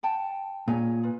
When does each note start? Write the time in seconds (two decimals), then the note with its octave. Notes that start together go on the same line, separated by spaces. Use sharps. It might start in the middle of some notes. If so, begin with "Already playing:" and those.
0.03 F#5 G5 A5
0.68 A#2 G#4 C#5 G#5
1.03 F4 B4